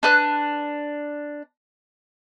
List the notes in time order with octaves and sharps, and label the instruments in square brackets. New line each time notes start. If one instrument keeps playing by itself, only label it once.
[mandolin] D4 B4 F#6